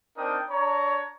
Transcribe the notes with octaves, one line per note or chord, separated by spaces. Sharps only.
C4 D4 D#4 A#4 G5 D#6
D4 C#5 A#5